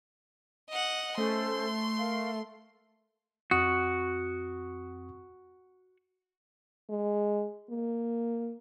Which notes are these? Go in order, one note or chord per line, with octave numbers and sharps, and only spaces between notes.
D#5 F#5
A3 C#4 A4 C5 C6
A#4 F5
F2 C4 F#4 D#6
G#3
A#3